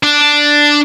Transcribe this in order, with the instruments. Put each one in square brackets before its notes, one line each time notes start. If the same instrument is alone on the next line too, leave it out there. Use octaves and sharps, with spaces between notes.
[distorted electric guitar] D4